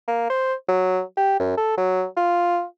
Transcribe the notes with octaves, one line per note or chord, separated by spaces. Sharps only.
A#3
C5
F#3
G4
F#2
A4
F#3
F4